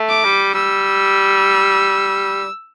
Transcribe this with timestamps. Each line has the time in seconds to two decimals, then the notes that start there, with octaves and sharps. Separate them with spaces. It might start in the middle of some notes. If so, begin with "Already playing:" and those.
Already playing: A3
0.09 D6
0.25 G3
0.55 G3 E6